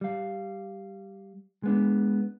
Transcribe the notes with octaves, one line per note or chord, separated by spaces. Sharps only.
G3 F5
G#3 B3 D4